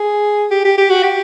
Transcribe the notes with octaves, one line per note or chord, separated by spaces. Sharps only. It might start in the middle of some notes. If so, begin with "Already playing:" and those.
Already playing: G#4
G4
G4
G4
F#4
G4